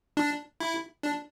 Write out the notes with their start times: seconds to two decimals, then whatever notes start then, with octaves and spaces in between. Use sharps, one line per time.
0.17 D4
0.60 E4
1.03 D4